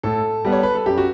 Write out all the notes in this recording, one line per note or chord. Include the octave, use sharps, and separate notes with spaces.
A2 A4
G3 B3
C#5
B4
A4
F#2 G4
F#4